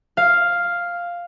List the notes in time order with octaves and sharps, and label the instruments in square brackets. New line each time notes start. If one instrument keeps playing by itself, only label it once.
[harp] F5